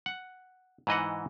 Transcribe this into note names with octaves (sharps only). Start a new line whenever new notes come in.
F#5
G#2 E3 D#5 F#5